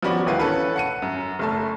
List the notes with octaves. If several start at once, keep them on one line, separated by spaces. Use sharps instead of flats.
F3 B3 C#4 F#4 B4 D5
A1 D2 E4 B4 F5
C#4 A4 B4
F#5 C#7 D#7
F#2
F#1 A3 A5